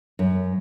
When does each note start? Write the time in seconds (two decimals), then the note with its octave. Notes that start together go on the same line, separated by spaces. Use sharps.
0.19 F#2